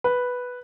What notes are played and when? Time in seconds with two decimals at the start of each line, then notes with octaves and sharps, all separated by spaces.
0.04 B4